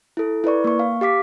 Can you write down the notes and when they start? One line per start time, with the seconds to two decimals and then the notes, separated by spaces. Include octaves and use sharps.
0.17 E4 A4
0.44 E4 B4 D5 C#6
0.64 A#3 C#6
0.79 F5
1.01 G4 F5 D6 B6